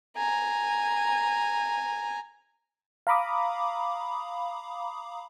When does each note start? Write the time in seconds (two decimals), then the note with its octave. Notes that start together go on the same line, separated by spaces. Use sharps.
0.17 G#5 A#5
3.07 F5 A#5 B5 D6 D#6